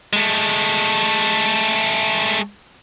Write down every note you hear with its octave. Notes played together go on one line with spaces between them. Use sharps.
G#3 A3